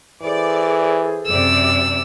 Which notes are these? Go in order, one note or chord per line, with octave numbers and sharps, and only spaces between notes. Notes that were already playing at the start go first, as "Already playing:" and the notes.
E3 G#4 A4 C5 D5
F#2 C3 D5 E6